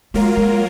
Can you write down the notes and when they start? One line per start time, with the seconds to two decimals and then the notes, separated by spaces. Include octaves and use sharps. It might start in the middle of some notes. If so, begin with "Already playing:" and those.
0.14 F#3 G#3 A#3 F4 A#4
0.37 G#3